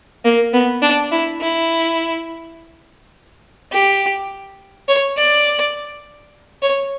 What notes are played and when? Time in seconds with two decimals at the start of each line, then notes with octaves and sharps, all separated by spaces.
0.25 A#3
0.53 B3
0.82 D4
1.11 E4
1.41 E4
3.72 G4
4.88 C#5
5.17 D5
6.62 C#5